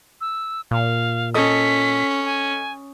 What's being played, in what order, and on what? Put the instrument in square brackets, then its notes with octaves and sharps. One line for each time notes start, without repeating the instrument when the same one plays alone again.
[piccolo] E6
[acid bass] A#2 [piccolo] F5
[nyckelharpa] C#4 [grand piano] A4 D#5 D#6 [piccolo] B6
[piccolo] G#5